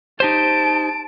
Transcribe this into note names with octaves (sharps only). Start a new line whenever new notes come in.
D#4 G4 C5 A5 D7